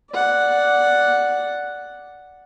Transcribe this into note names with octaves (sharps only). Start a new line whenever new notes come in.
D5 F#5